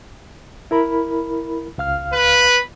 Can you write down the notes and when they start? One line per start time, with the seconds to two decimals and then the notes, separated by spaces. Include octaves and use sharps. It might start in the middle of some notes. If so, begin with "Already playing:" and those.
0.71 E4 A#4 B5
1.78 C#2 F5 F6
2.13 B4